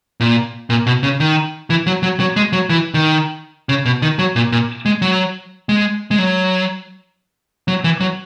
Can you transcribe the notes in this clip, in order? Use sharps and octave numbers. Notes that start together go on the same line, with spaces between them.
A#2
A#2
B2
C#3
D#3
E3
F#3
F#3
F#3
G#3
F#3
E3
D#3
C#3
B2
D#3
F#3
A#2
A#2
G#3
F#3
G#3
G#3
F#3
F#3
E3
F#3